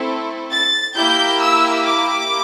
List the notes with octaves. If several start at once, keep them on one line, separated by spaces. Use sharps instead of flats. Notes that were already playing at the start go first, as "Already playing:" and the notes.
Already playing: A3 C4 E4 A4
A6
A#3 E4 G4 G6
E6
D6